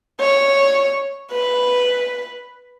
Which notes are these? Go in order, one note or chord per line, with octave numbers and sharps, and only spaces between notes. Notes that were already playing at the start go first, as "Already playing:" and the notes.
C#5
B4